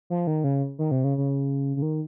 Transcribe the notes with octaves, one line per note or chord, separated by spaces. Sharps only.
F3
D#3
C#3
D#3
C3
C#3
C#3
C#3
D#3